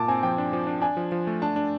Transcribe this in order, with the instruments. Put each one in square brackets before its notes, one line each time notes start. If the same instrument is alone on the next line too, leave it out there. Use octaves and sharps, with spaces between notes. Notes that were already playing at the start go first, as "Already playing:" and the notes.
Already playing: [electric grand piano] A#2 [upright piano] A5 D6
[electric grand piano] C4 [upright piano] G#5
[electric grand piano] F3 [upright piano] G5
[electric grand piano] D4
F3
D4
[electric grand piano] D4 [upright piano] G#5
[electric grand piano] F3
F3
A3
[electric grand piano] D4 [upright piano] A5
[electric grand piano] D4